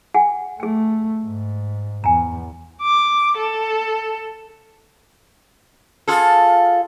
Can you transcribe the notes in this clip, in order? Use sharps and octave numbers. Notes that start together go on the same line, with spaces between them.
G#4 F#5 G#5
A3 G#4 G5
G#2
E2 G#5 A#5
D6
A4
F4 G#4 A4